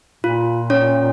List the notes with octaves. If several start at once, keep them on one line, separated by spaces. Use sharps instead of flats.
A#2 F4
C#4 C#5